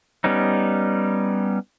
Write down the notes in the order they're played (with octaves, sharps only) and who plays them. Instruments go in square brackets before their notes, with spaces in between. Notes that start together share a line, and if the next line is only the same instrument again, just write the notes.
[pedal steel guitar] G3 B3 C#4 D#4